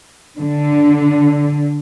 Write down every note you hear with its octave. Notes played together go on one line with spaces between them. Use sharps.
D3